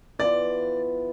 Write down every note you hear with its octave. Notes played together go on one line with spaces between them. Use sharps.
E3 B3 F4 D5